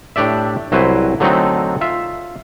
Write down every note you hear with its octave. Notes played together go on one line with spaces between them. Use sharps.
A2 D4 G4 D5 E5
C2 F#3 E4 B4 C5
D3 F#3 A3 C4 D#4
F4 E5